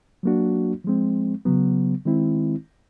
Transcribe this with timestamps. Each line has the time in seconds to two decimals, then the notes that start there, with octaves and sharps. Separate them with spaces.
0.23 F#3 A#3 D4 F#4
0.84 F3 G#3 C4
1.45 C#3 F#3 B3
2.05 D#3 G#3 C4 E4